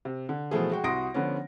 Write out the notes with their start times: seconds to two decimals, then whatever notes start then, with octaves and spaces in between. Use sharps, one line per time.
0.05 C3
0.29 D3
0.51 B2 E3 F3 A3 G#4
0.70 G#3 F#4 G5
0.84 C2 F#4 C6 D#6 A#6 D7
1.14 D3 F3 B3 C#4